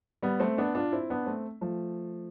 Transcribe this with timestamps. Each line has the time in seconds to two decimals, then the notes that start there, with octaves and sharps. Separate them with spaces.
0.22 G3 B3
0.40 A3 C4
0.58 B3 D4
0.75 D4 F4
0.92 C4 E4
1.10 B3 D4
1.26 A3 C4
1.61 F3 A3